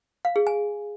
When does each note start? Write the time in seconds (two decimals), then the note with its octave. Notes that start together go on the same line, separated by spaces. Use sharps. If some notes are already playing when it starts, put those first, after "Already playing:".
0.25 F5
0.36 G#4
0.47 G#5